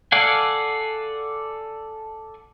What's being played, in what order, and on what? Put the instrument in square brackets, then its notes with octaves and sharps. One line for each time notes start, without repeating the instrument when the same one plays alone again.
[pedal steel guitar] A4 D5 F5 F#5 G#5